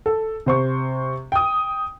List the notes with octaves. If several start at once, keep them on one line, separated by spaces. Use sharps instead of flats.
A4
C3 C5 C#6
G5 D#6